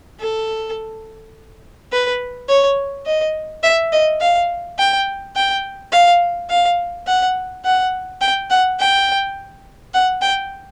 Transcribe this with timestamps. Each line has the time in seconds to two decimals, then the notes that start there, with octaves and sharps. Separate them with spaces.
0.20 A4
1.92 B4
2.48 C#5
3.06 D#5
3.63 E5
3.93 D#5
4.20 F5
4.78 G5
5.36 G5
5.92 F5
6.50 F5
7.07 F#5
7.65 F#5
8.21 G5
8.50 F#5
8.79 G5
9.94 F#5
10.22 G5